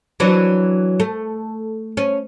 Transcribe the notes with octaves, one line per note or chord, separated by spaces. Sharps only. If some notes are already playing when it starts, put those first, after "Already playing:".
E3 F#3 D4
A3
C#4